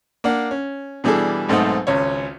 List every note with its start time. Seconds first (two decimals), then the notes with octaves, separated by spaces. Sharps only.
0.24 A#3 D4 F#5
0.51 C#4
1.04 B2 E3 G3 D4 G#4 A4
1.49 B1 G#2 A3 C4 D#4 F#5
1.87 G#1 C#2 C#4 C#5